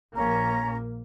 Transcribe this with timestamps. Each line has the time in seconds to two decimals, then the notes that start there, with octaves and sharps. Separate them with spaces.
0.15 A#1 A#3 C#4 A#5